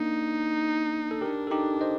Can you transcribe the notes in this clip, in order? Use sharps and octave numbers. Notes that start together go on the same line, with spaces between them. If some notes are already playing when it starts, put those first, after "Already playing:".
Already playing: A#3 D4 D#4
A4
D4 G4 A#4
A4
D#4 G4
C5 D#5